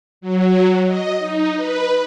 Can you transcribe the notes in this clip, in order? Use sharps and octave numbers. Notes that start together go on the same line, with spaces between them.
F#3
D#5
D#4
B4